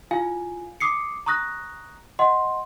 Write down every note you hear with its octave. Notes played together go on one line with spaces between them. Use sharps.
E4 F4 F5 G#5
D6 D#6 C7 C#7
A#5 C#6 D#6 F#6 A#6
D#5 F#5 C6